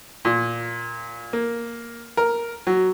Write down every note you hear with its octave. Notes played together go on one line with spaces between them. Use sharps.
A#2
A#3
A#4
F#3